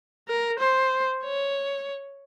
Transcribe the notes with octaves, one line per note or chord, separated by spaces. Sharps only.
A#4
C5
C#5